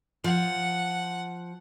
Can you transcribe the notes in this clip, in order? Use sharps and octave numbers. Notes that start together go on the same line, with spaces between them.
F3 F#5